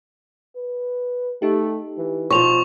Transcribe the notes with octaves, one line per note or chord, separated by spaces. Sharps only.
B4
A3 D#4 G4
E3
B2 F3 C#6 F7